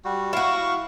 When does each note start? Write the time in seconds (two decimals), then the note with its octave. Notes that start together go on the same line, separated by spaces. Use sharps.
0.05 G3 F#4
0.33 E4 F#4 F5 C#6